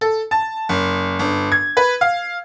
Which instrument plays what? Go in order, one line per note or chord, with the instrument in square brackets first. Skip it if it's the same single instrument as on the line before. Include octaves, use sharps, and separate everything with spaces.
[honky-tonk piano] A4
A5
F#1
G1
G#6
B4
F5